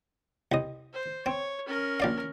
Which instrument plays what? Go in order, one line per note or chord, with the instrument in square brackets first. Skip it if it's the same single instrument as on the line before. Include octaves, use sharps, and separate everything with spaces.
[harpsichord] C2 D#5
[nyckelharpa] C5
[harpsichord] C4 [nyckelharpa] C#5
[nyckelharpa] C#4 A#4
[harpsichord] A#1 D5 F5